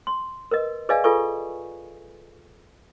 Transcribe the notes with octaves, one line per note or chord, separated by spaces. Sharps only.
C6
A#4 B4 D#5
G#4 B4 D5 D#5 F5 G#5
F4 G#4 A4 B4 G#5 C#6